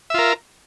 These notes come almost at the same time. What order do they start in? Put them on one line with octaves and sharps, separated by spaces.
E5 F4 A#4